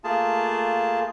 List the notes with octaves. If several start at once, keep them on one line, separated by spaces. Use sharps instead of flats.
A3 A#3 F4 G#4 A5